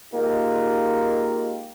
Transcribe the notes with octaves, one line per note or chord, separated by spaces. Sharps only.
G#3 A#3 D#4 F4 G4